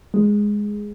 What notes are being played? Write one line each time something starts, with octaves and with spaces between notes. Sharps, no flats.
G#3